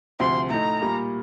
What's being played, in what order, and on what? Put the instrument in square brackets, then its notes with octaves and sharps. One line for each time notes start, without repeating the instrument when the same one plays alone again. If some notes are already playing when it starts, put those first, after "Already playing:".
[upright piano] D2 C3 F3 [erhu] C6
[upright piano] A2 A3 D#4 [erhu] A#5
[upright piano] A#2 G3 A#3